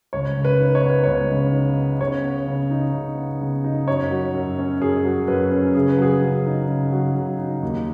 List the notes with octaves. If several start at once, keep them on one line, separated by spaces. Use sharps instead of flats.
C#2 C#5
C#3
B4
D#4
C#5
B3
B4
C#2 C#5
C#3
D#4
B3
C#3 C#5
B3
C#3
D#4
C#3
B3
C#3
D#4
F#2 C#5
F#3
F#2
C#4
F#2 G#4
F#3
F#2 B4
C#4
C#3 G#4
B4
F#3 G#4
C#3
D#4
C#3
F#3
C#3
D#4
D#2